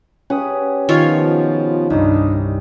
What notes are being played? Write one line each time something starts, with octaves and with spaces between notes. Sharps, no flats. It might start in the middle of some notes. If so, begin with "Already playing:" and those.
C#4 G4 B4 F#5 D#6
B2 D#3 F3 B3 F4 C#5
C2 G2 D4 D#4